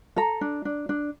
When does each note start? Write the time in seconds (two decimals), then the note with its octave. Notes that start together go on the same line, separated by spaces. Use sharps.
0.16 A4 A#5
0.41 D4
0.65 D4
0.89 D4